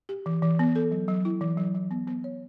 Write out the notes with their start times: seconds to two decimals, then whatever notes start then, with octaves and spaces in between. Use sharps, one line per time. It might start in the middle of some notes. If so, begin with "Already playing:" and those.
0.09 G4
0.26 E3
0.42 E3
0.59 B3
0.76 A4
0.91 F#3
1.08 F#3
1.25 E4
1.41 E3
1.57 F#3
1.75 F#3
1.91 B3
2.07 B3
2.24 C#5